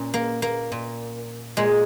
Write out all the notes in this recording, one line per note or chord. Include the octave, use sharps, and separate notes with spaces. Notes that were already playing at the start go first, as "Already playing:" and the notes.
Already playing: A#2 C#4
A#3
A#3
A#2
A#2 G#3